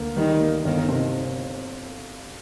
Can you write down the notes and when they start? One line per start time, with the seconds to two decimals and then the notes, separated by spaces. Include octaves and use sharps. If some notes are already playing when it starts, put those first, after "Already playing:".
Already playing: D2 A#3
0.16 D#3 G3
0.40 A#3
0.64 G1 D#3
0.89 C3